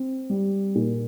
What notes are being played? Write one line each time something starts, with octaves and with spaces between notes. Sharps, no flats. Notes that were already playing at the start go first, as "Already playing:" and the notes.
Already playing: C4
G3
A#2